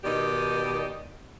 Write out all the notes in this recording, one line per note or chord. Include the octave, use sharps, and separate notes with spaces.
B2 D#3 D#4 G4 D5